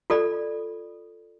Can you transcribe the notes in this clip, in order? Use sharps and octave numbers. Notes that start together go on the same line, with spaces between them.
F4 A4 D5 B5